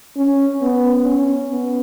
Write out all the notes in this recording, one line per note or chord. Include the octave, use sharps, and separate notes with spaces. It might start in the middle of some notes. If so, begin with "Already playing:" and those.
C#4
B3
C#4
B3